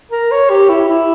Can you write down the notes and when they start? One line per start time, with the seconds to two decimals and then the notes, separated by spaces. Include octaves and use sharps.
0.12 A#4
0.31 C#5
0.50 G4
0.69 E4
0.88 E4